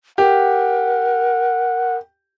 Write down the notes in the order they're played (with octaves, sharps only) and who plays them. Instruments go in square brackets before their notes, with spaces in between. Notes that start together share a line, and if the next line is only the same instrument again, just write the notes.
[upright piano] G4 [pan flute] A#4 [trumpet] F#5